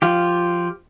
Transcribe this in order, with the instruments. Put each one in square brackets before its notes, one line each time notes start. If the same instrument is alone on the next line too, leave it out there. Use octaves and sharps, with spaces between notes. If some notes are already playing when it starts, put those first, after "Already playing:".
[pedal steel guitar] F3 F4 G4